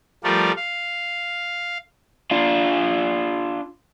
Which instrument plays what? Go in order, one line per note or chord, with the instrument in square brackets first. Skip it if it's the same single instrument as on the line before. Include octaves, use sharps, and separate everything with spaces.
[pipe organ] F3 G3 A3 F4 A#4 D5
F5
[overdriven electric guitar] D4 F4